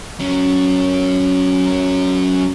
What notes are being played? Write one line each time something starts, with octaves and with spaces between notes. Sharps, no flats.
F#3 C#4